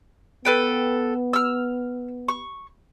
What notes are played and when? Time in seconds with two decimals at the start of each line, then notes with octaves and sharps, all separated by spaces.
0.45 B3 A4 B4 G5
1.33 E6 F6
2.28 C#6